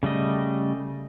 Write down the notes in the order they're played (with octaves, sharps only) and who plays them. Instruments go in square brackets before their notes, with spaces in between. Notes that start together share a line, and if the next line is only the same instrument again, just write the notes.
[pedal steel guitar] C#3 G3 A3 D#5